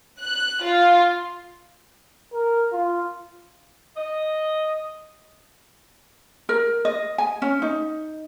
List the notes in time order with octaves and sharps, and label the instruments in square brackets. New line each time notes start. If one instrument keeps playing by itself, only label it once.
[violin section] F#6
F4
[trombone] A#4
F4
[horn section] D#5
[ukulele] A#4
D#5
G#5
C#4
D#4